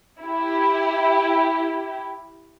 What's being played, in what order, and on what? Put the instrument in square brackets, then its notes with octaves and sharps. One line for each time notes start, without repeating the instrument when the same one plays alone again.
[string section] E4 G4